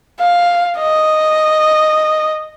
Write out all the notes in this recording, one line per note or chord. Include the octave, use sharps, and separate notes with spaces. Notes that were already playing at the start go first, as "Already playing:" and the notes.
F5
D#5